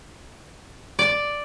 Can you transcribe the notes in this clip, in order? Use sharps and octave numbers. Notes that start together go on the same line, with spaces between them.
D5